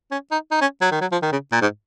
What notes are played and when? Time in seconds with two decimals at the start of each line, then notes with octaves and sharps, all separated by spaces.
0.11 C#4
0.31 D#4
0.51 D#4
0.61 C#4
0.81 F#3
0.91 D#3
1.01 F#3
1.12 F3
1.22 D#3
1.32 C#3
1.52 A#2
1.62 G#2